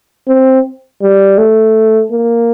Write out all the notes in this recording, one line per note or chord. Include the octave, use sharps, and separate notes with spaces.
C4
G3
A3
A#3